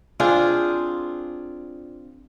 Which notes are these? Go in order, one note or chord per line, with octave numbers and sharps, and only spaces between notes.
C4 D4 F4 G#4